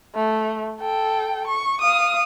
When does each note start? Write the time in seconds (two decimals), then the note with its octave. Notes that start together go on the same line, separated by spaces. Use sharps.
0.15 A3
0.80 A4 G5
1.47 C#6
1.81 F5 D#6